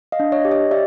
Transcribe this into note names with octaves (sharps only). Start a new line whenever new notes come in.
D#5 F5
D4
C#5 D#5
G4
C#5 D#5
G4 D5 E5